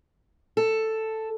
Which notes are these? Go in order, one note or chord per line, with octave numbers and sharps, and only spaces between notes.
A4